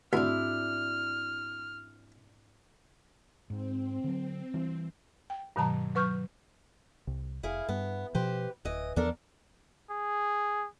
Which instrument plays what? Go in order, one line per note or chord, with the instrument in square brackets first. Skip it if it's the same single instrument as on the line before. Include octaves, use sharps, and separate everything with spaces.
[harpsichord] D2 [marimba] G#2 C4 F#4 [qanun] D4 E4 [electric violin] F6
[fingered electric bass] G#2 [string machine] C4
[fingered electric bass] D3 F#3
E3 G3
[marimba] G5
G2 B2 D#3 F#3 A5 A#5
F#3 B4 C#6 F6 G6
[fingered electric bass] C2
[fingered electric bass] F1 [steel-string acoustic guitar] E4 G#4 F5
[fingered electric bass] G2 [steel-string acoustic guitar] B3
[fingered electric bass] B2 F3 [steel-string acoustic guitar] G4 B4 C5
[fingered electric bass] D1 [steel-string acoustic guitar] E3 D#5
[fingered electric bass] E2 F3 B3 [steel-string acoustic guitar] D4 A4 A#4
[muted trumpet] G#4